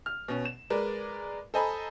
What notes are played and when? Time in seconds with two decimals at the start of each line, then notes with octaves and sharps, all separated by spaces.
0.06 F6
0.28 B2 C#4
0.45 E7
0.70 G#3 A#4 B4 D5
1.54 A4 C5 D#5 G#5 A#5 B5